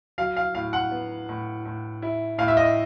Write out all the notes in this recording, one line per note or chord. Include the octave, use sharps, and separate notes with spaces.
F#3 F5
F5
A2 F5
F#5
B3
A2
A2
E4
A2 F5
E5
D#5